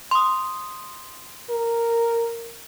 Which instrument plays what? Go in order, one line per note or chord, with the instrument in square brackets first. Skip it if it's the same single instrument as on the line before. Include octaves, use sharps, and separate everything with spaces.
[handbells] C6 D#6
[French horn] A#4